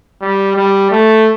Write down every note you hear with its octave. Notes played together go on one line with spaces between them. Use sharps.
G3
G3
A3